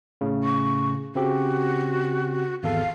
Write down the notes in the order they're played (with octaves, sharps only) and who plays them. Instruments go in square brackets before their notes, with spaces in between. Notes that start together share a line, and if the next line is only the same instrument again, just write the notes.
[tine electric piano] A2 C#3
[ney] C#6
[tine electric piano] C#3 C4 G4 [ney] F#4
[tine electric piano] G#1 E2 A4 [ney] F5